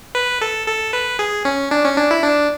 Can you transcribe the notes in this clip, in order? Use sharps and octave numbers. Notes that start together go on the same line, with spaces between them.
B4
A4
A4
B4
G#4
C#4
D4
C#4
D4
E4
D4